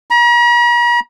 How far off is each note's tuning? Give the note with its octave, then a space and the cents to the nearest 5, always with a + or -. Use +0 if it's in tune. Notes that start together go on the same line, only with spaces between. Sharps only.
A#5 +45